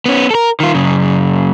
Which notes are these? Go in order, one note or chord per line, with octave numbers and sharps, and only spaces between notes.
B3 C#4
A4 A#4
D#3 F4
F#2 C#3